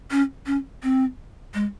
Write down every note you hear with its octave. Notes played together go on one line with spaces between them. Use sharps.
C#4
C#4
C4
G#3